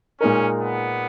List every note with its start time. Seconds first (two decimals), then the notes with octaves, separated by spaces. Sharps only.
0.20 A#2 G#3 C#4 D#4 A#4
0.61 B3